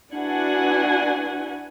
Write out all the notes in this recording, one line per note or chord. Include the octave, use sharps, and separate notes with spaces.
D4 E4 F#4 B4 F#5 G#5